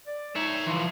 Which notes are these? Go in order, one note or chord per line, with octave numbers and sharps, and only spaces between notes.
D5
D#4 C#5 E5
E3 F3 C6